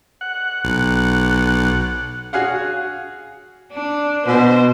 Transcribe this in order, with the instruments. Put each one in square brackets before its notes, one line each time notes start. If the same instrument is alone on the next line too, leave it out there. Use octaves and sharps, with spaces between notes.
[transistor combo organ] F#5
[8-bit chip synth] B1
[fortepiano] F#4 G#4 F5 F#5
[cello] D4
[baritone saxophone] B2 [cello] C5